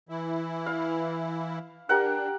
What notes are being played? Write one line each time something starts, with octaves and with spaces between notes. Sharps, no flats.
E3 E4
F5
D4 G4 A#4 F#5